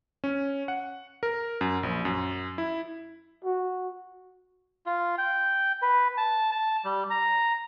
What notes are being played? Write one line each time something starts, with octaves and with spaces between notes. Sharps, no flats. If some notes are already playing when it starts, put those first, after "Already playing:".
C#4
F#5
A#4
F#2
A#1
F#2
E4
F#4
F4
G5
B4
A5
A5
G3
A#5